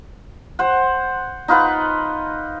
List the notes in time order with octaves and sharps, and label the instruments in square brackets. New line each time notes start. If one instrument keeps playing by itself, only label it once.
[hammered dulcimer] C5 F#5
D#4 F4 B4 F#5